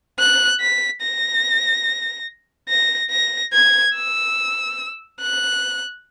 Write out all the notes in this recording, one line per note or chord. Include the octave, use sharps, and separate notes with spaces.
F#6
B6
A#6
A#6
A#6
G#6
E6
F#6